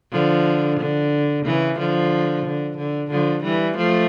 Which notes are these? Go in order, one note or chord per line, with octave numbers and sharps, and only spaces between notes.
D3 F3
D3
C#3 E3
D3 F3
D3
D3
D3 F3
E3 G3
F3 A3